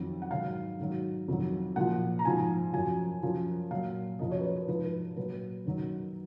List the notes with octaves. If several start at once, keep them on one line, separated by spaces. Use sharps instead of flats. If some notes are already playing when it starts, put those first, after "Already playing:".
Already playing: F2 D#3 F#3
F#5
G#2 D#3 F#3 F5
G#2 D#3 F#3
F2 D#3 F#3
A#2 F3 F#5
A#5
G#2 F3 G#5
F#2 F3 G#5
F#2 F3
A#2 F#3 F5
F#2 F3 D#5
C#5
B4
C#5
B4
G#2 F3 B4
B4
A#2 F#3 B4
F#2 D#3 F#3